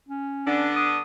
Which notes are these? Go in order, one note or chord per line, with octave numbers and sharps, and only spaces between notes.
C#4
D3 B3 D4
D#6